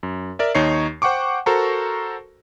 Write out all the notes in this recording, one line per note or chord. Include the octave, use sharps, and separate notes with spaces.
F#2
A#4 D5 E5
D#2 D#4 C#5 C#6 C7
C5 F#5 G5 C#6 D6
F#4 A4 A#4 C5 A#5 C#6